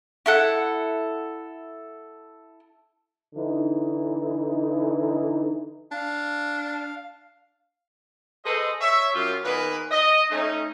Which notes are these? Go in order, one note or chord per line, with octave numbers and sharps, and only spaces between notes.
E4 A4 F#5
D3 E3 D#4
D4 F5
G#4 A4 B4 C5 D#5
C#5 E5
F#2 F4 G4
A#2 D#3 B3 G#4 A#4 B4
D#5
A3 C#4 D#4